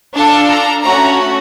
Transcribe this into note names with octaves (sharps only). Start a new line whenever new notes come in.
D4 F4 A4 A5
A#5
A3 C#4 F#4 A#5